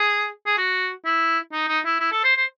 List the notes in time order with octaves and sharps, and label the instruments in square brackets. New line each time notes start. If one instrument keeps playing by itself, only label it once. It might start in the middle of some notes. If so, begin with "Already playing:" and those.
Already playing: [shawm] G#4
G#4
F#4
E4
D#4
D#4
E4
E4
A4
C5
C5